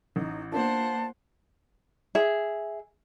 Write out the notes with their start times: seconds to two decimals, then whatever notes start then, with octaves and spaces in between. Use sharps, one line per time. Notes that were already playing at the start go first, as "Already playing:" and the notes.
0.16 A1 D#4
0.52 A#3 B3 D4 F4 C5 F#5 A5
2.15 G#4 E5